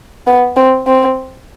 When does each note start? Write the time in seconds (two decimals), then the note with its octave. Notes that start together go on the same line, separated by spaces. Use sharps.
0.27 B3
0.56 C4
0.87 C4